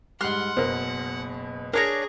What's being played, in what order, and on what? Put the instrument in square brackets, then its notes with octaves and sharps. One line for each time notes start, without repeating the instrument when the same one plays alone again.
[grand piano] G#2 G3 [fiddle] F#5 [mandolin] C6 F6 F#6
[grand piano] F#1 B2 [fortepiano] A#4 C5
[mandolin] D4 C#5 A#5 [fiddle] G#4 [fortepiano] A#4